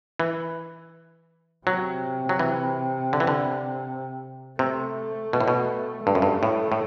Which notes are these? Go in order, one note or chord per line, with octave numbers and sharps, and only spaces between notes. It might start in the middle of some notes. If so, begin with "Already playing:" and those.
E3
C3 F#3
F#3
E3
D3
E3
D3
C3 A3
B2
A2
B2
G2 A3
F#2
G2
A2
A2